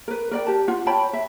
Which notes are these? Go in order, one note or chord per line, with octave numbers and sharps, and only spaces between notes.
A#4 B4
A#4 D5 G5
G4 A5
F4 F#5
C#5 G5 A5 B5
E5